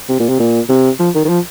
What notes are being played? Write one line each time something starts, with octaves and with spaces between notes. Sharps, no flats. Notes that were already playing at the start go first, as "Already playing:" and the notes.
C3
A#2
C3
A#2
C3
F3
D#3
D#3
F3